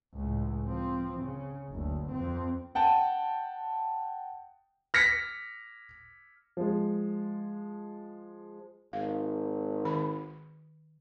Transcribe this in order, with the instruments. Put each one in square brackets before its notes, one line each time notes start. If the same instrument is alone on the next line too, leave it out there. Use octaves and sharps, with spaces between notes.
[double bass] C#2 A2
F3 C4
C#3
F#1 D2
F2 C4
[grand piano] F#5 G5 A5
F6 A#6 B6 C#7
F3 G#3
[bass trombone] G#1 [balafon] F5
[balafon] D#3 B5